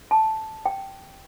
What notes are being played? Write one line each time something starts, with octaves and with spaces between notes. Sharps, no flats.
A5
G5